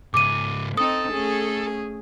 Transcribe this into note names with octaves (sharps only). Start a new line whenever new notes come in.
G#2 C#3 D6 D#7
C4 D#4 A4 D#6
A3 C#4 G#4